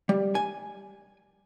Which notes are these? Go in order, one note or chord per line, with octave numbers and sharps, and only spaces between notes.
G3
G#5